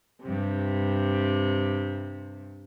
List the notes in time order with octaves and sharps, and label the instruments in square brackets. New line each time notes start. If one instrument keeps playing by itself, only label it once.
[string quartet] G2 C3